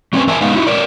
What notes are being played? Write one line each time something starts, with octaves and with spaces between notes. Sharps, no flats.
F#3 C4 C#4 A#4 B4 G#5
E2 A#4 E5 G#5 A5
G#3 B3 D#4 B4 F5
D#4 E4 F#4
A#4 C#5 D5